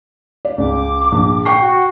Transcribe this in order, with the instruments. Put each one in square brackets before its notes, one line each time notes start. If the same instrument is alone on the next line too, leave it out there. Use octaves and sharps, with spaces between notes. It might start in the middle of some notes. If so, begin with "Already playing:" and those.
[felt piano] D5
[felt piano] C#2 [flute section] D6
[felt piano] A#1
G5 C#6 C7
[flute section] F#4